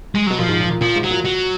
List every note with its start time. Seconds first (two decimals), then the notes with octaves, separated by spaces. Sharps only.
0.15 G#3
0.27 B2 F#3
0.38 A#2 F3
0.49 G#2
0.60 A#2
0.71 A#2
0.81 A#2 F3
0.96 G#2
1.03 F#3
1.11 A#2
1.25 F#3